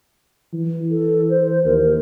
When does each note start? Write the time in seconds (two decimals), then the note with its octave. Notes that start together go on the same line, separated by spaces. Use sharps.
0.54 E3
0.91 A4
1.30 C5
1.64 D#2 A#4